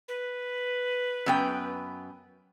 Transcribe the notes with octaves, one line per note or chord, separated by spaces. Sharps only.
B4
F#2 B3 G5